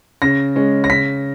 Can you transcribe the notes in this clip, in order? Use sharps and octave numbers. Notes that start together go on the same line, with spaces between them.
C#3 A#6
G#3 C#4
A#6
C#3 B6